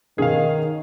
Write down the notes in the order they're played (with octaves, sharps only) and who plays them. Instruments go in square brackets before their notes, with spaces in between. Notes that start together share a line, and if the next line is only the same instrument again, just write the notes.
[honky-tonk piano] B2 C#4 [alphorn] D#3 [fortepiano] G#4 F5